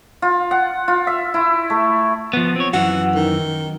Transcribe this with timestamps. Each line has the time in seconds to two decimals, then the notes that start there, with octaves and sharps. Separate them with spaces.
0.22 F4
0.51 F#5
0.88 F4
1.07 E5
1.34 E4
1.70 A3
2.33 F3 B3
2.56 C4 C#5
2.73 F#2 E3 F#4
3.15 D#3